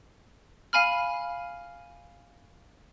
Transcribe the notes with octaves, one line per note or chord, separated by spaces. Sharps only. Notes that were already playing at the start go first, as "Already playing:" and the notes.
F5 G#5 B5 F6